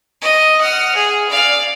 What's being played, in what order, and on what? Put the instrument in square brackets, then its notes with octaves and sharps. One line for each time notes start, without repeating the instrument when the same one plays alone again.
[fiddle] D#5
F#5 F6
G#4
D5 F5